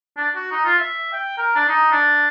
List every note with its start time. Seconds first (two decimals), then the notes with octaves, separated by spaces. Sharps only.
0.17 D4
0.36 F#4
0.51 D#4
0.65 F4
0.78 E5
1.13 G5
1.37 A#4
1.55 D4
1.68 D#4
1.91 D4